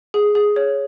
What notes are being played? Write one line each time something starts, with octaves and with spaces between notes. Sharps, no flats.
G#4
G#4
C#5